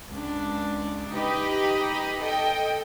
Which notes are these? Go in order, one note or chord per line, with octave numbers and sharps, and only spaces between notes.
C#2 D4
D#4 G4 B4 D#5 B5
A4 D#5 G5